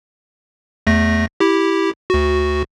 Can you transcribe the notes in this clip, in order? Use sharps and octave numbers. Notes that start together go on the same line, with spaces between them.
E2 A3 A#6
E4 G4
D2 F#4